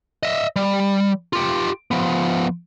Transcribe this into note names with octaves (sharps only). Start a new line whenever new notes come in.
D#5 E5
G3
F4 G4
F3 B3